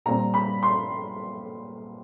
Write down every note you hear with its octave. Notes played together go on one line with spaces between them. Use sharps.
A#2 G3 C4 A#5
B5
C6